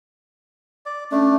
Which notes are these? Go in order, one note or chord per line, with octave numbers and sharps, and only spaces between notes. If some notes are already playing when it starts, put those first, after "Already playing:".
D5
A3 C#4 D4